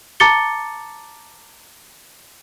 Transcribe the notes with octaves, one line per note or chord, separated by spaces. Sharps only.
A5 A#5 D6 A6 C#7 G7